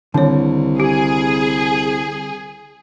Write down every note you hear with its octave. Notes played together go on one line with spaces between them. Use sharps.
C2 D3 D#3 C#5
G4 G#4